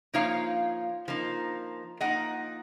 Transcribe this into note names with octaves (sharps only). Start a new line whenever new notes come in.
F3 A#3 D#4 C#5 F5
F3 A#3 D#4
F3 A#3 D#4 D#5 F#5